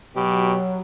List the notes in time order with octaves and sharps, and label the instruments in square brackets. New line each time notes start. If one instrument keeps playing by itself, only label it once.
[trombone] B2 [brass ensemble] F#3 [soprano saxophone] G4